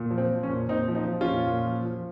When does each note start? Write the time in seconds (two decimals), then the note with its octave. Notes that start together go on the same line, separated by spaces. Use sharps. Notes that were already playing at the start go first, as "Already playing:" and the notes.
Already playing: A#2
0.11 F3
0.18 C4
0.30 F3
0.43 C#4
0.49 A#2
0.69 A#2 C4 D#4
0.88 F3
0.95 C4 D#4
1.08 F3
1.21 C#4 F4
1.27 A#2
1.47 A#2
1.66 F3
1.85 F3